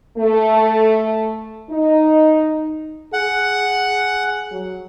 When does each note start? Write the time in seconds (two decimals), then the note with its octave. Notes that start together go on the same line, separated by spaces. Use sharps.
0.17 A3
1.69 D#4
3.13 G#4 F#5
4.52 F#3